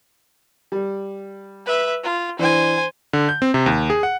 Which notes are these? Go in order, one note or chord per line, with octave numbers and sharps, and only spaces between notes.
G3
B4 E5
F4
E3 D4 C5 G#5
D3
G6
C4
C3
D#2
G#4
F#5